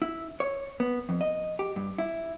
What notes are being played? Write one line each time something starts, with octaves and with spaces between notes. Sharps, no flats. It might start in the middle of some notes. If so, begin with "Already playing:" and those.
E4
C#5
B3
F2
D#5
G4
G2
E4